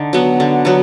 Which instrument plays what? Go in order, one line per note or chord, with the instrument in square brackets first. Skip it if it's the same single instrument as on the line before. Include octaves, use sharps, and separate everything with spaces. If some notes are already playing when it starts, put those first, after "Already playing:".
Already playing: [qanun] D3 D#4
F#3 B3
D3
F#3 B3